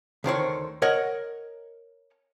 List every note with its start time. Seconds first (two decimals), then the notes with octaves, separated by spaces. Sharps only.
0.24 D2 D#3 C5 C#5
0.82 A#4 C#5 D#5 F#5